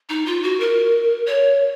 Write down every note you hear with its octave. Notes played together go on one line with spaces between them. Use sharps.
D#4
F4
F#4
A#4
C#5